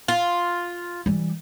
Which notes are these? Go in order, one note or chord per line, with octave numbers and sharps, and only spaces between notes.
F4
E3 G3